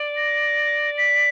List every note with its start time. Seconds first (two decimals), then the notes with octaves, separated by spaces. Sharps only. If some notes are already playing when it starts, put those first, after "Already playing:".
Already playing: D5
0.17 A#6
0.98 B6